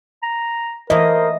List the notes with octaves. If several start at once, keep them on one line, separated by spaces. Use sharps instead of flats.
A#5
E3 A3 A#3 A#4 C5 D#5